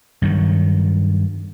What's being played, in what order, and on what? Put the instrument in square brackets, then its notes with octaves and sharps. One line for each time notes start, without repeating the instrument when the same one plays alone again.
[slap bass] G2 D#3 F#3